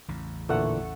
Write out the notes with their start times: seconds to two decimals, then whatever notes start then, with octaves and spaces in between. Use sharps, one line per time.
0.08 A1 E2 C#3
0.49 A#2 D3 E3 A3 F#5